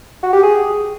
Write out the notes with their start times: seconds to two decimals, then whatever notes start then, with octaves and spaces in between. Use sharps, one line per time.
0.23 F#4
0.33 G4
0.43 G#4